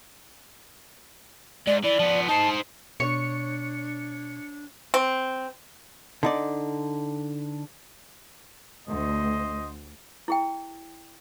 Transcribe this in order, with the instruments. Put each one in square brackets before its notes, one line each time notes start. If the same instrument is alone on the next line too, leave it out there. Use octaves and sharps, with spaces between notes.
[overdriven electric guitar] G#2 [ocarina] D5
[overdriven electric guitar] E3 [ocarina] D5
[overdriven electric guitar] F3 B3
[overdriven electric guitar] D#4 C5 [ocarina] A5
[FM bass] B2 [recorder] D4 [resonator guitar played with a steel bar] C#5 [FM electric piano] C#7
[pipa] C4
[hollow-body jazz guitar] D3 D#4 D5
[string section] D2 [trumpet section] C5 D#5
[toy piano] E4 G#4 G5